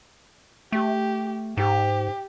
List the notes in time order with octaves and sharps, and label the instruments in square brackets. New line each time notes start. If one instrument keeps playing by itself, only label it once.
[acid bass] A3 [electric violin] G4
[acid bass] G#2 [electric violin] G4